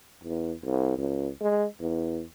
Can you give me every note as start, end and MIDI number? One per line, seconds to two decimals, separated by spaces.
0.24 0.52 40
0.64 0.94 36
0.98 1.29 37
1.41 1.65 56
1.81 2.22 40